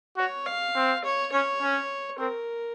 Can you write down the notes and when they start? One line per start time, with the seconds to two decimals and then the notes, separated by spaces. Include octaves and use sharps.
0.17 F#4 C#5
0.46 F5
0.75 C4
1.04 C#5
1.32 C#4 C#5
1.62 C#4
2.18 C4 A#4